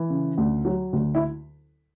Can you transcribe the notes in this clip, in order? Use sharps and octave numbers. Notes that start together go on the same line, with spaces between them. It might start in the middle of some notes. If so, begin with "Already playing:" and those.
Already playing: E3
C#3
D2
F#3
D2
E4